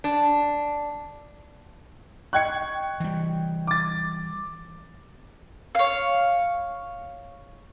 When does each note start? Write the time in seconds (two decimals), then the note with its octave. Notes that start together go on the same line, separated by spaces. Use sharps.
0.04 D4
2.33 D#5 G5 C#6 F#6 G#6 C#7
3.00 E3 G3
3.67 D6 A6
5.75 C#5 F5